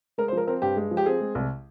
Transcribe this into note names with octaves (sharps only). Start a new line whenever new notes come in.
G#3 A#4
C5
F3 A#4
C4 A#4
G2 G4
G#3
F3
G4
C4 G#4
G#3
C2